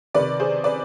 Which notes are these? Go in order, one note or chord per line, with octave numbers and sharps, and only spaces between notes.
C3 D#3 B4 D5
G#4 C5
B4 D5